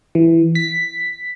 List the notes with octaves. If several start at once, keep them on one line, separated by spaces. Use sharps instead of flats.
E3
B6